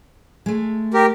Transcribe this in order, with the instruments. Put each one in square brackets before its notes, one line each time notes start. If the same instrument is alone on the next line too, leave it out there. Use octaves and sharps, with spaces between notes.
[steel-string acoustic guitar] G#3 A3
[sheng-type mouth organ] G4 A#4